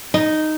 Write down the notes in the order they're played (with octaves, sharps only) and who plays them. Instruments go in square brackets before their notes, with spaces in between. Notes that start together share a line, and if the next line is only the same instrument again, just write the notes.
[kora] D#4